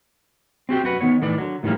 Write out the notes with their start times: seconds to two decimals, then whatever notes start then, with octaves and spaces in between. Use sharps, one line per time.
0.69 C4 F#4 G4 G5
0.84 F#2 F#4 B4
1.01 D#3 B3 C#5
1.22 A2 D#3 E3 D5
1.38 D3 F#3
1.63 A2 D#3 F3 G3 A#3